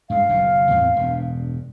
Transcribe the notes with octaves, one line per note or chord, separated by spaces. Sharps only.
G2 G#3 F5
F#1 F#2 B2
E2 A2 C4
E1 G2